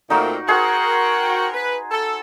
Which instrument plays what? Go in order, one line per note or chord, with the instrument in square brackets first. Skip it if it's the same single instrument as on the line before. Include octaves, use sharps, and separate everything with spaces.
[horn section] A#2 A3 C4 [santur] D#4 F#4 A#4
[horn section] F#4 A#4 G5 [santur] G#4 C5 F#5
[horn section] B4
A4